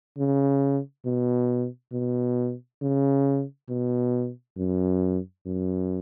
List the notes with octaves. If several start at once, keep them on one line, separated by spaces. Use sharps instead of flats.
C#3
B2
B2
C#3
B2
F#2
F#2